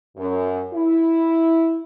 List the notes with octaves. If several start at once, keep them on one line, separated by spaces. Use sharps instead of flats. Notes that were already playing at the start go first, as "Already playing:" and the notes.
F#2
E4